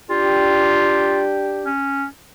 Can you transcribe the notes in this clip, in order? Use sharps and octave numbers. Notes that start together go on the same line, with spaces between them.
D4 F4 G4
C#4